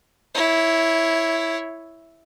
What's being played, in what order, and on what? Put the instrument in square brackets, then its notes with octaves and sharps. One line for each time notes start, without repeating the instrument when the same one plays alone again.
[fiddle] E4 C#5